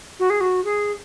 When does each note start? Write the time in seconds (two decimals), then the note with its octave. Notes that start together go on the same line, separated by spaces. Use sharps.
0.19 F#4
0.30 G#4
0.41 F#4
0.65 G#4